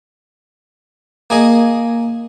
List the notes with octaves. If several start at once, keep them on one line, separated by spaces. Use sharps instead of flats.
A#3 G#4 D#5